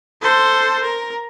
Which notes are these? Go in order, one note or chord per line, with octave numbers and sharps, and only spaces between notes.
A4 C5
A#4